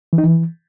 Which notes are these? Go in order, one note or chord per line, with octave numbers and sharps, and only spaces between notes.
E3
D#4
E3